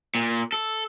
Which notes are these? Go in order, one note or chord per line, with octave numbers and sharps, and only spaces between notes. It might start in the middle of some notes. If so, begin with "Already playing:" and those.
A#2
A4